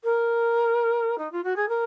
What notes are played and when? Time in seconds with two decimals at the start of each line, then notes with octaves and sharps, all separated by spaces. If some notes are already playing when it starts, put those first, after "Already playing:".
0.04 A#4
1.18 D#4
1.32 F4
1.43 F#4
1.56 G#4
1.68 A#4